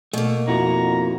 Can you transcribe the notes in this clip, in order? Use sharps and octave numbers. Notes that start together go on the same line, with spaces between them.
B2 A3 A#3
F2 E4 F#4 A#5